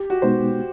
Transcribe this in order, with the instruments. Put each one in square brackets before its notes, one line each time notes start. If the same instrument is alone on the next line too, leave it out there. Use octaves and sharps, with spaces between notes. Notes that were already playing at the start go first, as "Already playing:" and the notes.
Already playing: [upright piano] G4
F#4
[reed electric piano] B2 G#3 B3 D#4 [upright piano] C5